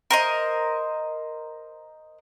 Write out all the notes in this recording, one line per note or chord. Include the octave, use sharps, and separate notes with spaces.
A#4 C5 D#5